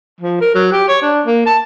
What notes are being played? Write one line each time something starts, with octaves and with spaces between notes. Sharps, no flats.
F3
A#4
F#3
G4
C#5
D4
A#3
A5